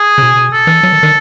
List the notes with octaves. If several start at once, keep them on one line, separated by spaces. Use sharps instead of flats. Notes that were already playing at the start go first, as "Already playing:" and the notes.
Already playing: G#4
C#3
B2
A4
E3
F#3
D#3
D#3